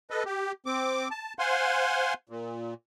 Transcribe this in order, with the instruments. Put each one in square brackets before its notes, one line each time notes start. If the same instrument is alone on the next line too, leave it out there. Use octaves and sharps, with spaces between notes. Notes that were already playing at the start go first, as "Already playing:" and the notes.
[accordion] A4 B4 D#5
G4
C4 D6
A5
C5 F5 F#5 G#5 C6
A#2